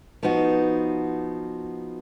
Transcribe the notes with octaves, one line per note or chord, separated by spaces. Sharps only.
F3 B3 D#4 F#4